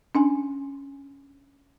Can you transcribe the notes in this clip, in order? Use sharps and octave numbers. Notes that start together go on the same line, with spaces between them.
C#4 D4 G#5